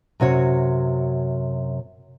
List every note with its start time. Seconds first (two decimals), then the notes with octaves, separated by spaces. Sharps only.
0.20 F#2 C3 F#4 C#5